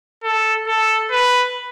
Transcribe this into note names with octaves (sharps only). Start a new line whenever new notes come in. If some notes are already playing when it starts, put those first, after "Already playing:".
A4
A4
B4